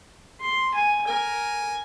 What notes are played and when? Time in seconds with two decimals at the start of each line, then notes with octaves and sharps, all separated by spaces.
0.41 C6
0.74 G#5
1.08 A#4 G#5